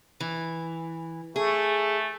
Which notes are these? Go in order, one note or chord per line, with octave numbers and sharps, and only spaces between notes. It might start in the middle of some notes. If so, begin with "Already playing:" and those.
E3
A3 G#4